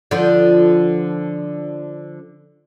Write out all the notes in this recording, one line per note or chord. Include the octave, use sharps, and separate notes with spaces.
D3 F3